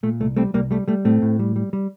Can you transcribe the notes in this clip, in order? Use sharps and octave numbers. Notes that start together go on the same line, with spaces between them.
A#2 A3
C2 A3
G3 A3 C4
C2 G3 A#3
G3 A3
G3 A3
A2 A3 C4
A2
G3
G3
G3